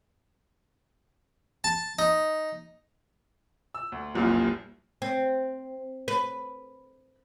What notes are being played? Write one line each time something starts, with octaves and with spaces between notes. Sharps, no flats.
A5
D#4
E6
D2
F1 C2 F#2 A#2
C4
B4